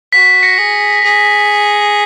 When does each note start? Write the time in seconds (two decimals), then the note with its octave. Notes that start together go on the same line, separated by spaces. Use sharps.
0.12 F#4 B6
0.43 A#6 C#7
0.58 G#4
1.04 G#4